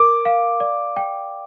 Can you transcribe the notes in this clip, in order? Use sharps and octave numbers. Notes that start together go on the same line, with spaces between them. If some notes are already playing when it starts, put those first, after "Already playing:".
Already playing: A#4 D6
F5
D5
G5